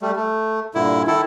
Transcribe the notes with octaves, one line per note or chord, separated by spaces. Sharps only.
G3 A3
A3
G2 A#2 D3 E4
D#3 E4 A4